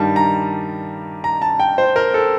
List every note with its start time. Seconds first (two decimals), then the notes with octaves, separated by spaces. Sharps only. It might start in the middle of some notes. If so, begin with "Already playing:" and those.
Already playing: G2 D#3 G3 A5
0.16 A#5
1.24 A#5
1.42 A5
1.60 G5
1.78 C5
1.96 A#4
2.14 A4